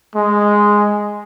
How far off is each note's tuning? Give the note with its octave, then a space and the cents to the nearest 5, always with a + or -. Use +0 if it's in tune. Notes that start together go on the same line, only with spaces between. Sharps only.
G#3 -5